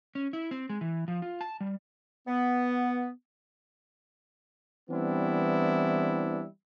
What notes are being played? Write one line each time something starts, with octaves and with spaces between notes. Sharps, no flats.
C#4
E4
C4
G#3
E3
F3
F4
A5
G3
B3
E3 G3 B3 C4 D4 E4